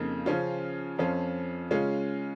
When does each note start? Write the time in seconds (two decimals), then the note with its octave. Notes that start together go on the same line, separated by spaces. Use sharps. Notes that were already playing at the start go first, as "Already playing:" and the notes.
Already playing: F2 C#3 A#3 D#4
0.26 C#3 F3 C#4 F4
0.98 F2 F3 C#4 F4
1.71 C#3 G#3 C#4 F4